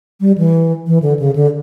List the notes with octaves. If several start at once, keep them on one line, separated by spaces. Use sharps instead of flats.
G3
E3
E3
D3
C#3
D3